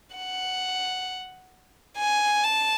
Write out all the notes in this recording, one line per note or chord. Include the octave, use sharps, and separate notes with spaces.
F#5
G#5
A5